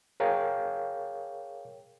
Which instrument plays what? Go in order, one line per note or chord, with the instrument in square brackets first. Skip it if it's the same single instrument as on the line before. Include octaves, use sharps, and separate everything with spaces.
[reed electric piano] G#4 A#4 C#5 F5 G5